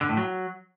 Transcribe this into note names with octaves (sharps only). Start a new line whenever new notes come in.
D3
A2
F#3